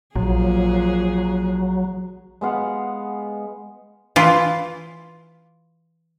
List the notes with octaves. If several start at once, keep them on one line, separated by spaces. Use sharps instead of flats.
A#1 A#2 F3 F#3 G#4
G#3 B3 F5 F#5
E3 F4